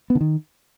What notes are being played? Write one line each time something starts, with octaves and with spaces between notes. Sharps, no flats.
B3
D3
D#3